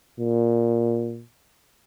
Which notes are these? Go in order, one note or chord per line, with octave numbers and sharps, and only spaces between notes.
A#2